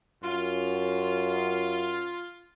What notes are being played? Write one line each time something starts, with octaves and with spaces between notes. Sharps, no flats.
F#2 F4